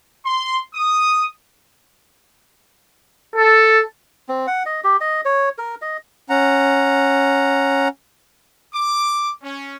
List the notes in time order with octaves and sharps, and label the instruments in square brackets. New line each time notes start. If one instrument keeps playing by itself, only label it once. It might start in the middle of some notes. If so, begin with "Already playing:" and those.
[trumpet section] C6
D#6
A4
[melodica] C4
F#5
D#5
G4
D#5
C#5
A#4
D#5
[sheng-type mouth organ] C#4 F#5 A#5
[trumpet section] D6
C#4